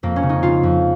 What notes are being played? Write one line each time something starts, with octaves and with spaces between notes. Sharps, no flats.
F2 A#3
C#4
C#3
D#4
C#3 F4
F2